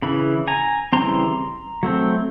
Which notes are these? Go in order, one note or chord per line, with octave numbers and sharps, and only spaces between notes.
C#3 E3 B5
G#5 A#5
C#3 E3 G3 C4 A#5 C6
F#3 A3 C4